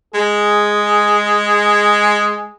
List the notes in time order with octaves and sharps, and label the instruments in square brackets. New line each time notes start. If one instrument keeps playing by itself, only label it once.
[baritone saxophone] G#3 [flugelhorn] G#4